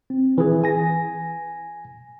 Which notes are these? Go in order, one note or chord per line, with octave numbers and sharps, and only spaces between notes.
C4
E3 G#4
G#5 A#6